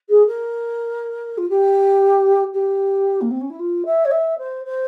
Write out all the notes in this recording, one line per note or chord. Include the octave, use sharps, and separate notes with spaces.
G#4
A#4
F4
G4
G4
A#3
C4
C#4
E4
F4
E5
C#5
E5
C5
C5